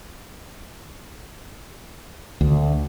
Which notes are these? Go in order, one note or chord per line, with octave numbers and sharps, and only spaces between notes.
D2